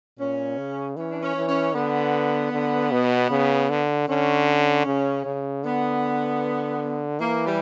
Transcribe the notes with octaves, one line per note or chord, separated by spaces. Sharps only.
A#2 C#4
C#3
E3 C#4
D4
C#4
E3
C#4
D3 B3
D3
B2
C#3
D3
D3 C#4
C#3
C#3
D3 B3
E3 A#3
G3